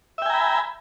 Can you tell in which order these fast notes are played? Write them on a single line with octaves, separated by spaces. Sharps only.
E5 G5 G#5 A#5 B5